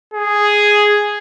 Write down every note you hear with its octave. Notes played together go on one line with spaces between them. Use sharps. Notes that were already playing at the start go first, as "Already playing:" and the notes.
G#4